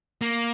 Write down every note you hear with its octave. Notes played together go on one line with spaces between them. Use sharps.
A#3